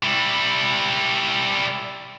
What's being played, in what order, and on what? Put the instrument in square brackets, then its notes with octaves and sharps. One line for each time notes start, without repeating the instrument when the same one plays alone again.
[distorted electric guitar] G3 E4